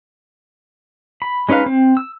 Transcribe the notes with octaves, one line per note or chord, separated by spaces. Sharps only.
B5
G#3 C#4 D#4 B4 F5
C4
E6